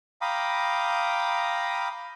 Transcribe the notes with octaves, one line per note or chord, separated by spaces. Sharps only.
F5 G5 A#5 B5 D6 D#6